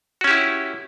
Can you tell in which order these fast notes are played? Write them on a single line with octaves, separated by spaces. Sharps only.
F#4 C#4 G4 E4